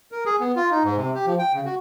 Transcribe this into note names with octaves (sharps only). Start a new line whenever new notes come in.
A#4
G#4
B3
F4
D#4
G#2
C3
G4
F3
G5
C#3
F#4